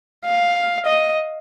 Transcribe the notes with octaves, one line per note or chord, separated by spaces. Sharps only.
F5
D#5